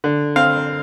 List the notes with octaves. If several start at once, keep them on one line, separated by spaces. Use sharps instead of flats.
D3
C4 F5